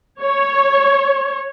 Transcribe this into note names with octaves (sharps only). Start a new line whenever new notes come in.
C#5